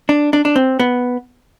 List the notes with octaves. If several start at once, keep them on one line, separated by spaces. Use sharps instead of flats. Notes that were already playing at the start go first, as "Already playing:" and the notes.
D4
D4
D4
C4
B3